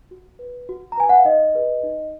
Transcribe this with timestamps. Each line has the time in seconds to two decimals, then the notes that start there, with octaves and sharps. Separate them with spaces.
0.11 F#4
0.39 B4
0.69 F#4
0.92 A#5
0.98 B4 G#5
1.09 F#5
1.18 F5
1.25 D#4 D#5
1.55 G#4 B4
1.83 D#4